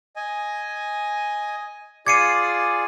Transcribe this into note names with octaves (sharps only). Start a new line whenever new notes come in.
D#5 G#5
F4 G#4 D5 D6 G#6 C7 C#7 D#7